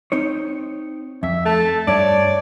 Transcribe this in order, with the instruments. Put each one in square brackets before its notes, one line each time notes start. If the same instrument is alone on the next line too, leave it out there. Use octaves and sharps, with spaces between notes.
[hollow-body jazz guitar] C4 D#4 C#5
[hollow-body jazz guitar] F2 [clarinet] E5
[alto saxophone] A3 [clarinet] A5
[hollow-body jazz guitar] G2 D4 [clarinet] C#5 [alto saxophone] D5